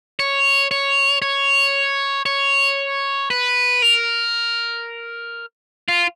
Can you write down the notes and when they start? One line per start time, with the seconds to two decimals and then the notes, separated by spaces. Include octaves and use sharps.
0.19 C#5
0.71 C#5
1.22 C#5
2.26 C#5
3.30 B4
3.82 A#4
5.89 F4